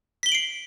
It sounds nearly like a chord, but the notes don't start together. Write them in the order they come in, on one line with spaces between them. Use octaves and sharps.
B6 G7 F#7 D7 C7